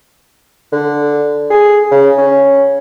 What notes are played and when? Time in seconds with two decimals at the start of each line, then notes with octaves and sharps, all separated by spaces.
0.72 D3
1.50 G#4
1.91 C#3
2.18 C#4